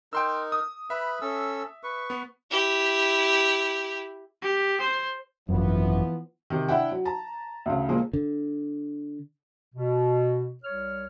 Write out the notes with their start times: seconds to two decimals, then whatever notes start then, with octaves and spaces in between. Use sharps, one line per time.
0.13 D#4 A#4 G5 C6 E6
0.52 D#6
0.90 B4 E5 B5
1.21 C#4 A4 E6
1.83 B4 C#6
2.10 B3
2.51 E4 G4
4.42 G4
4.81 C5
5.49 G#1 F#2 E3 F3 B3
6.50 C3 D#3
6.68 D4 E4 E5 F#5 G5
6.91 F#3
7.05 A5 A#5
7.66 D2 C#3
7.89 A#2 F3 G#3 A#3
8.13 D3
9.75 B2
10.64 C2 C#5 F6